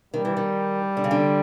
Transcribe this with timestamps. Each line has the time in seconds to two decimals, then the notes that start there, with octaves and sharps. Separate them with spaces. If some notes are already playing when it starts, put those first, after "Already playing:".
0.14 D#3 G3
0.25 E3
0.37 D#3
0.97 D3
1.04 C#3
1.11 D3